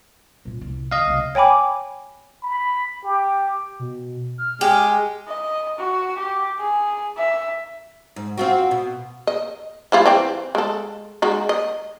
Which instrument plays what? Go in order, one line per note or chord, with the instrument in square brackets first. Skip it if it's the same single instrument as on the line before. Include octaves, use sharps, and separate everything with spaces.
[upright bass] A#2 C#4
C2
[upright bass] D3 [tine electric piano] D#5 F5
[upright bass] C#2 C3
[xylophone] C#5 G5 G#5 B5 D6
[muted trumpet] B5
G4
[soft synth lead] B2
F6
[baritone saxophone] G#3 [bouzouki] G4
[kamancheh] D#5
F#4
G4
G#4
E5
[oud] G#2
C4 F4 F#4
B2
[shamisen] D#5
G3 E4 F4
E3 C4 G5
G#3 A4
G#3 D#4 F#4
D#5